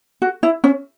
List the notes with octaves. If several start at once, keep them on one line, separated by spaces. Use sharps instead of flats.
F#4
E4
C#4